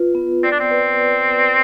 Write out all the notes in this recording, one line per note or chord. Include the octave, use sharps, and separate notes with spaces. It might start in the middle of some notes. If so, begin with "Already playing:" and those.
Already playing: F4 B4
B3
C4 D5
D4
C4
B4